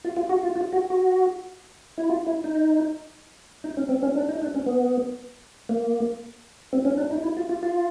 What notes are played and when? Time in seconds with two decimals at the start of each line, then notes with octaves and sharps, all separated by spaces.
0.04 F4
0.17 F4
0.29 F#4
0.43 F4
0.56 F4
0.73 F#4
0.90 F#4
1.98 E4
2.10 F4
2.27 E4
2.44 D#4
3.64 D#4
3.77 C#4
3.89 C4
4.03 C#4
4.16 D4
4.29 D#4
4.42 D4
4.55 C#4
4.66 B3
5.69 A#3
6.73 C4
6.85 C#4
6.97 D4
7.11 D#4
7.23 E4
7.37 F4
7.49 F4
7.63 F4